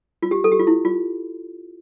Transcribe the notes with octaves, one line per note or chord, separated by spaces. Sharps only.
F4
G4
A4
G4
F4
E4
F4